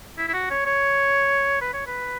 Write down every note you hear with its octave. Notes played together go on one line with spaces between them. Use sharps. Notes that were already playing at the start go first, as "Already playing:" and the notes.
E4
E4
F#4
C#5
C#5
B4
C#5
B4